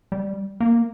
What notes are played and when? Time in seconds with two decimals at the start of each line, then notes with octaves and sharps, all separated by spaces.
0.12 G3
0.60 A#3